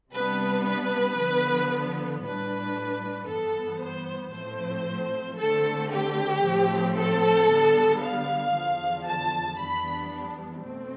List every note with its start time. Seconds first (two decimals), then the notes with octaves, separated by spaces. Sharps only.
0.12 C3 G3 B3 D4 B4
0.65 B4
1.16 D3 F3 B3
2.22 A2 G3 D4 B4
3.27 G2 E3 B3 A4
3.79 C5
4.32 A2 F3 A3 C4 C5
5.37 D3 A3 C4 A4
5.90 G4
6.43 A2 F3 A3 C4
6.96 A4
7.49 D3 G3 B3
8.01 F5
8.54 E2 D3 F3
9.06 A5
9.58 F2 E3 G3 B3 D4 B5
10.63 B2 A3 C4